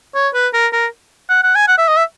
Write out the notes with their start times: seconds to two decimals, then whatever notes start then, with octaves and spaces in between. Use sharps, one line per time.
0.15 C#5
0.34 B4
0.53 A#4
0.73 A#4
1.30 F#5
1.43 F#5
1.55 G#5
1.68 F#5
1.78 E5
1.88 D#5
1.97 E5